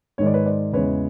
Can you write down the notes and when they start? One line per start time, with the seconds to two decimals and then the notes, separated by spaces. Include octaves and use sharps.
0.18 G#2 D#3 G#3 C#5
0.26 D5
0.34 B4 C#5
0.46 C5 D5
0.73 E2 C#3 E3 G#3 B4 C#5